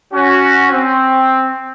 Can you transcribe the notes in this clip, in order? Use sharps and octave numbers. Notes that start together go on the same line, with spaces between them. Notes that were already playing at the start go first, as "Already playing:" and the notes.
C#4 F#4
C4